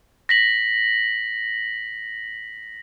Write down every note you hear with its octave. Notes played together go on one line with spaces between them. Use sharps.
A#6 B6 F#7